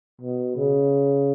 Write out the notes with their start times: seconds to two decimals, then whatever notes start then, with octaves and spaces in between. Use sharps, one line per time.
0.21 B2
0.56 C#3